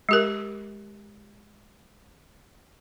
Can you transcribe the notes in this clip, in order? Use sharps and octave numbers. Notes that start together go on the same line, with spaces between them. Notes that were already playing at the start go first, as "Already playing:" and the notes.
G#3 G4 A#4